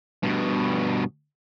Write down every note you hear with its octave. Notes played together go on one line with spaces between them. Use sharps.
G2 B2